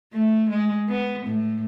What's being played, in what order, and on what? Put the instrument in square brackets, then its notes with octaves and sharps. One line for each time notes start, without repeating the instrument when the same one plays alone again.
[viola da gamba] A3
G#3
B3
A2